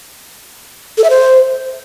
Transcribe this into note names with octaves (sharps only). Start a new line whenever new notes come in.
A4
E5
C5